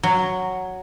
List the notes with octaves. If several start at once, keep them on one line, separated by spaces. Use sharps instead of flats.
F#3